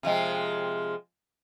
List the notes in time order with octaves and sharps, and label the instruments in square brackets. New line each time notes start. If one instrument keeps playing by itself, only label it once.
[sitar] C3 F3 G#3